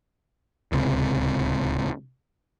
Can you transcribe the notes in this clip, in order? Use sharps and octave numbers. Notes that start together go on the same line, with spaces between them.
D1 C#2 C3